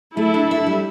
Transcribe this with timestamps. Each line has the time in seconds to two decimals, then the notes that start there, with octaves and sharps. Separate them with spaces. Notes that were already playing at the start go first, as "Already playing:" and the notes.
0.17 A3 E4 A4
0.34 D4
0.51 E5
0.67 G3